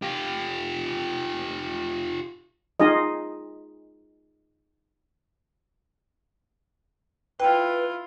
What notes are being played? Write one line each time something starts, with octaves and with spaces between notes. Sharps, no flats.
F4 G4
D#4 F4 G#4 D#5
E4 F4 B4 G5